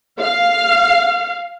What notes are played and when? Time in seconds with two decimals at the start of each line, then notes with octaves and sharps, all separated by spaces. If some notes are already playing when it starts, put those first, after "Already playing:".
0.19 F5